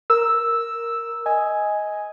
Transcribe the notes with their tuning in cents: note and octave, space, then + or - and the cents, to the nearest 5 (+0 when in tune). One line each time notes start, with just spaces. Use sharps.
A#4 +0 E6 +0
D#5 +15 G#5 +0